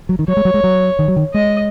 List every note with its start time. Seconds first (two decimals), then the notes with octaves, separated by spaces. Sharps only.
0.09 F#3
0.19 D#3
0.28 F#3 C#5
0.37 G#3
0.45 F#3
0.54 G#3
0.64 F#3
0.99 D#3
1.08 F#3
1.16 D#3
1.34 G#3 D#5